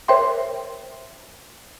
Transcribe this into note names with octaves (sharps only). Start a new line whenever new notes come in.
A#4 C5 C#5 E5 G5 C6